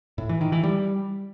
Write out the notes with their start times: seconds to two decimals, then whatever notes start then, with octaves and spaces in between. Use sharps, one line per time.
0.18 A2
0.29 E3
0.41 D#3
0.52 E3
0.64 G3